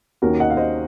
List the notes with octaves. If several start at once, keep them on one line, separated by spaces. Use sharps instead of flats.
D#2 D#3 A#3 C#4 F#4 A#4
D#5 F#5
F5
C5 D#5